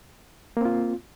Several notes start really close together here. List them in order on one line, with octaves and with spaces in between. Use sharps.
A#3 C4 F4